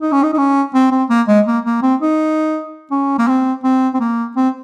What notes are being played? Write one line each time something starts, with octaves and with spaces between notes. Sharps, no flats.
D#4
C#4
D#4
D#4
C#4
C4
C4
A#3
G#3
A#3
A#3
C4
D#4
C#4
A#3
C4
C4
C4
A#3
C4